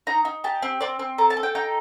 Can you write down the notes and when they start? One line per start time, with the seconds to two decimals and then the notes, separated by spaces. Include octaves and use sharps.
0.07 D#4 A#5
0.25 D#4
0.44 G4 A5
0.62 C4
0.81 C4 D5
0.99 C4
1.18 A4 A#5
1.30 A5
1.37 A4
1.43 G5
1.55 D#4 G5